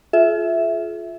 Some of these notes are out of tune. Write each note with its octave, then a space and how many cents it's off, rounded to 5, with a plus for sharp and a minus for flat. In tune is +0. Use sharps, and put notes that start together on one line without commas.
F4 +0 G#4 +45 E5 +0